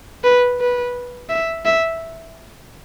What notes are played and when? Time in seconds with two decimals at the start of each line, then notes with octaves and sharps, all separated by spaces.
0.24 B4
0.60 B4
1.30 E5
1.66 E5